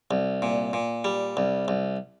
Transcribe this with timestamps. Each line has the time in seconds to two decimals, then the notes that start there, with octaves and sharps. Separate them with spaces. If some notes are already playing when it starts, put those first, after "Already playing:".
0.11 C2
0.42 A#2
0.73 A#2
1.05 G3
1.37 C2
1.68 C2